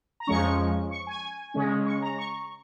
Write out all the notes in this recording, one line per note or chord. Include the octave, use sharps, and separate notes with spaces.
A#5
F2 F3 G#3 C#4 C#6
C#6
G#5
C#3 G#3 C#4
C#6
A#5
C#6